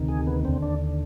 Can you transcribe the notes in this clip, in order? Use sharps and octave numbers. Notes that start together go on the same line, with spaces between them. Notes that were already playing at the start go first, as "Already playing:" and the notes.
Already playing: D2 C3 D#3
G#4
B3
D#2 D3 C4
D4